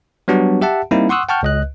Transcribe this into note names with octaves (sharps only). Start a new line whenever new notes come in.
F#3 G3 B3 D4 F#4
G4 E5 F#5 A5
G3 A#3 C4 D#4 E4
F#5 C6 C#6 D#6 E6 F#6
F#5 G5 A5 C#6 F6 G6
C#2 D#5 F#6